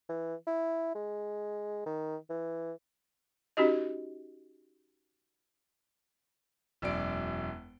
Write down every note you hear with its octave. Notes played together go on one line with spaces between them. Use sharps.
E3
E4
G#3
D#3
E3
C#4 D#4 F#4 G4 D#5
E1 F#2 D5 D7